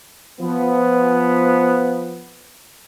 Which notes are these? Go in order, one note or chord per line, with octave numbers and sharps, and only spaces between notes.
F3 B3